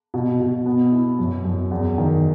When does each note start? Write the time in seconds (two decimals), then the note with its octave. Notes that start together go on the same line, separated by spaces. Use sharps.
0.14 B2
0.40 B2
0.66 B3
0.92 E4
1.19 F#2
1.45 F#2
1.71 E2
1.98 D#3